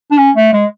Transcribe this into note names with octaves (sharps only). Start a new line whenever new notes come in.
D4
C#4
A3
G#3